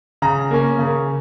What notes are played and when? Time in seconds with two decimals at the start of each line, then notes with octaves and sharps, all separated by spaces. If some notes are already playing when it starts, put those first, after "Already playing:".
0.22 C#3 A#5
0.51 A#3 C#4
0.79 C#3